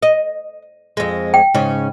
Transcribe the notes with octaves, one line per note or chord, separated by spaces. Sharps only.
D#5
F2 G#3
G5
G#2 C#3 C#4